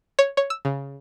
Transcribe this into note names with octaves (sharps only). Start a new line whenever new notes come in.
C#5
C#5
E6
C#3